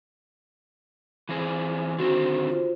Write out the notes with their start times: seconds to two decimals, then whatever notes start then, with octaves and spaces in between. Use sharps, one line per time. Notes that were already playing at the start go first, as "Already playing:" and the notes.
1.29 E3 C4 G#4
1.99 D3 D#3 C4 F#4
2.50 F4 C5